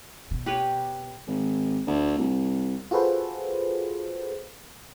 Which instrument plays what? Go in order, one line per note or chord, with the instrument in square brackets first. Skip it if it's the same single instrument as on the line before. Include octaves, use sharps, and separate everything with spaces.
[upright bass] B2
[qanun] G4 B4 C#5
[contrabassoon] G#1
D2
C2
[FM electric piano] F4 F#4 G#4 A4 B4 C5